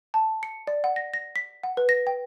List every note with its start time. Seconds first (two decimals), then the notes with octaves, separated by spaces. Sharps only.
0.14 A5
0.43 C#7
0.67 D5
0.84 F#5
0.96 A#6
1.14 A#6
1.36 B6
1.64 F#5
1.77 B4
1.89 A#6
2.07 G5